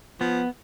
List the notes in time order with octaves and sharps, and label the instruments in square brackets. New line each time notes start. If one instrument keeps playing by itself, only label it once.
[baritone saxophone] F3 [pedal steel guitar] B3